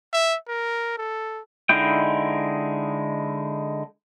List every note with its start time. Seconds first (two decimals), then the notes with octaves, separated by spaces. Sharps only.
0.13 E5
0.48 A#4
0.98 A4
1.69 D3 G#3 D#4 E4 G5